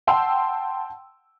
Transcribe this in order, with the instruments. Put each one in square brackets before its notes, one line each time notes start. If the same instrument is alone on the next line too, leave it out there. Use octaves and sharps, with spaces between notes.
[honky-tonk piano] F#5 G5 A5 C6 E6